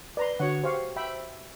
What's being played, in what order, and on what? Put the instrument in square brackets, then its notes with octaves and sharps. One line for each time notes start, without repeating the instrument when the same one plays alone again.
[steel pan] B4 A#5 C6 [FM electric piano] D5
[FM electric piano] D3 [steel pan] F#4 C#5 F#5
[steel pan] G4 F5 C#6 [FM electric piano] C5
[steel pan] E5 G5 B5